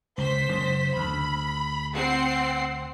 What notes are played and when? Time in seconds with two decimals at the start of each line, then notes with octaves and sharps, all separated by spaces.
0.18 C#2 C5 B6
0.49 F#1 C#3
0.96 D2 B5
1.94 C4 F#5 C7